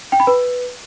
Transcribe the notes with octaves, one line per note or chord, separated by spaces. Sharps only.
G5
B5
B4